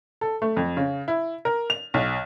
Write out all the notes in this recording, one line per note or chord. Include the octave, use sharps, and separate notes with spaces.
A4
A3
F2
C#3
E4
A#4
F7
B1